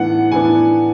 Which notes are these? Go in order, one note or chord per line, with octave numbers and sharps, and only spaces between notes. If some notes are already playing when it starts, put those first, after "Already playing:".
Already playing: A2 E3 B3 D4 F#5
A2 E3 B3 D4 G#5